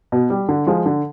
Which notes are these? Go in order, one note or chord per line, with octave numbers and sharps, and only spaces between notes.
B2
G3
D3
F3 G#3
D3